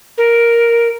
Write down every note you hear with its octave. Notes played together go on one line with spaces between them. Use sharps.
A#4